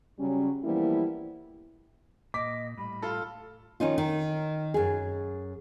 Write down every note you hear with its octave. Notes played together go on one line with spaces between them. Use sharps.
C#3 F#3 G3 C#4
E3 F3 G3 A#3 B3 E4
A#2 D#5 D6 B6
A2 G3 B5
F4 A4
D#3 C#4 D#4 F4
D#3
F#2 G#4